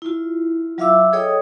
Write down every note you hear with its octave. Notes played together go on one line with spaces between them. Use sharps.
E4 F4
F#3 F4 E5 F5 D6 E6
G#4 A4 C#5 D#5 G5 D#6